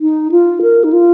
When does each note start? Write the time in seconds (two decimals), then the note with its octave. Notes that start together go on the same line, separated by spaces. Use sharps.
0.01 D#4
0.32 F4
0.62 A#4
0.84 D#4
0.93 F4